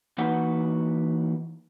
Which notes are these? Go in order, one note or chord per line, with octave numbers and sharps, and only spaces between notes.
E3 A#3 D#4 F#4 B4 F#5